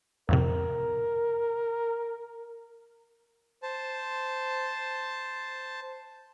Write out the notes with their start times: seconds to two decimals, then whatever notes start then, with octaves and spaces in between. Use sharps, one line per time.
0.29 F2 A2 C3 A#4
3.63 C5 A5